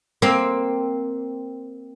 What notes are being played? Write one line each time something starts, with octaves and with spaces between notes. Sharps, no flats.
A#3 C4